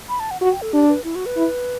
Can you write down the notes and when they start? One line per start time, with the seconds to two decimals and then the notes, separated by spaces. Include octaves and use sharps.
0.09 B5
0.20 A5
0.31 F#5
0.41 F#4 F#5
0.52 G5
0.62 A4
0.73 D4 G4
0.89 B4
1.04 E4
1.15 F#4
1.26 B4
1.37 E4